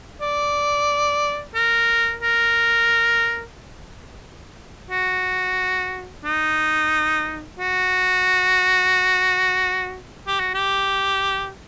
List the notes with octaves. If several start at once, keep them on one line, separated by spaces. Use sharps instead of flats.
D5
A#4
A#4
F#4
D#4
F#4
G4
F#4
G4